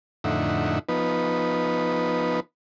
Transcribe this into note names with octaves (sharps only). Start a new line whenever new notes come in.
F2 A2 D3 D#4 E5 F#5
F3 B3 D#4 B4